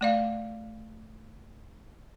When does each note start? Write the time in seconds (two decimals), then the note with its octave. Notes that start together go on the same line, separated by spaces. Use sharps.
0.01 A3 D5 F5